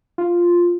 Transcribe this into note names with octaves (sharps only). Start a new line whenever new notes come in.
F4